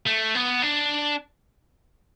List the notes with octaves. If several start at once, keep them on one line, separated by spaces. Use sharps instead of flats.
A3
B3
D4